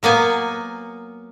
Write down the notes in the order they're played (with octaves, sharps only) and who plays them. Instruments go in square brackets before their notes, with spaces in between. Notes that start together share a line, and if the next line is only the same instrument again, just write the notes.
[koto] F#3 A#3 B3 G#5